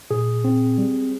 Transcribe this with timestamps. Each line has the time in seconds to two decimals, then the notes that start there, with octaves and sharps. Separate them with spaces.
0.11 A#2 G#4
0.44 C4
0.78 G3